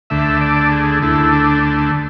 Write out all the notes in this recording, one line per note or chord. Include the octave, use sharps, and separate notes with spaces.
D2 D3 A3 E5
D5
G#4
D2 D3 A3 E4
D4